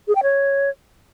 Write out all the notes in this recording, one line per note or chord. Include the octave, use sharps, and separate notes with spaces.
G#4
G5
C#5